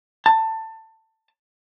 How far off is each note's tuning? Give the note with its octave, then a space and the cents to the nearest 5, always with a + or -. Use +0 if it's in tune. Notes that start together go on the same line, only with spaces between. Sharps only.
A5 +20